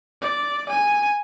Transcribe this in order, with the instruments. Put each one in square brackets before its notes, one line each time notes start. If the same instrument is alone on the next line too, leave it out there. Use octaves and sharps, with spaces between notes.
[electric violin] D5
G#5